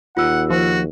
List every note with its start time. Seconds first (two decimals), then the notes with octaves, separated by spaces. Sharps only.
0.17 D#2 F4 F#5 E6
0.50 F3 F#4